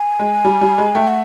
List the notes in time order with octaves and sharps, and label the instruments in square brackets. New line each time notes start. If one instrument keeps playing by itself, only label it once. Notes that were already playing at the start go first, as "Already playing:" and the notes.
Already playing: [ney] G#5
[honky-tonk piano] G#3
G3
G3
G#3
[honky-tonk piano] A3 [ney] G5
[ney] F#5